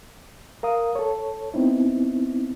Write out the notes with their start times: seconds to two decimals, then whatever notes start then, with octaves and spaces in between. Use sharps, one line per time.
0.63 A#4 F5 D#6
0.95 A4 C#5
1.54 B3 C4 D#4 E4